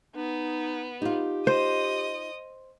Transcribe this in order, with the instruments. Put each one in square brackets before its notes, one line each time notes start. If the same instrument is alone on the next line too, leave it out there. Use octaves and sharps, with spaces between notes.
[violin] B3 [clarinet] D#4
[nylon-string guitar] D#4 F4 [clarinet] G4
[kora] C5 [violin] D#5 D#6